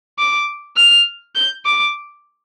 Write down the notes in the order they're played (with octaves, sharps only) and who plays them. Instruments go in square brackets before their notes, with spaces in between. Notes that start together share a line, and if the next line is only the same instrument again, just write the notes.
[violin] D6
F6
G6
D6